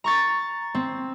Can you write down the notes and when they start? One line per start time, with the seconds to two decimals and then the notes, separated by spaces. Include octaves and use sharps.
0.04 A#5 C#6 A6
0.75 C4